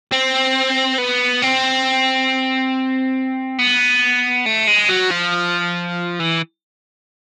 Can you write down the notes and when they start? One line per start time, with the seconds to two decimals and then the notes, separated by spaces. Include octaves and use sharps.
0.12 C4
0.98 B3
1.42 C4
3.59 B3
4.46 A3
4.67 G#3
4.90 F#3
5.11 F3
6.20 E3